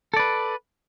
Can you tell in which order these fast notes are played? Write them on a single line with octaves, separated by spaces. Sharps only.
A4 D5 B4